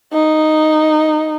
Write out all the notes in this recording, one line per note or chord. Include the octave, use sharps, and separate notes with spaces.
D#4